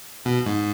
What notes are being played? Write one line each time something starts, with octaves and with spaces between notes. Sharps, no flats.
B2
G#2